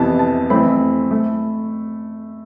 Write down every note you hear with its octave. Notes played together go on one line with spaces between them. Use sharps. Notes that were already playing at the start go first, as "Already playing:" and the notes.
Already playing: F2 C3 E3 B3 A5
A5
F2 E3 A3 C4 B5
A3